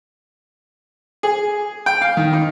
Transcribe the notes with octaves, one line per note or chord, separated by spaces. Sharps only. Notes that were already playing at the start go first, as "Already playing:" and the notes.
G#4
G5
F5
D#3
D#4